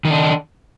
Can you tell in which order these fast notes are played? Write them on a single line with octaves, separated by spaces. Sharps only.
D#3 D#4 D4